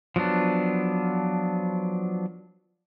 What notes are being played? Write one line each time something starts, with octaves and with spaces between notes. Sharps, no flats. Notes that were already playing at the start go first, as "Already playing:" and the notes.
F3 F#3 B3 D4